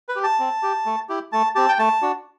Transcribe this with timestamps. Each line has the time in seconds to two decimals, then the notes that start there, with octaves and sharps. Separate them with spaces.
0.09 B4
0.16 G4
0.24 A5
0.39 C4
0.63 G4
0.86 A3
1.09 E4 G4
1.32 A3 A5
1.55 C4 G4 A5
1.69 G5
1.79 A3 A5
2.02 D4 F#4